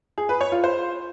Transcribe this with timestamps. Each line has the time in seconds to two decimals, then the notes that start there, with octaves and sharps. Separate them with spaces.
0.18 G#4
0.29 B4
0.41 C#5
0.52 F4
0.64 C5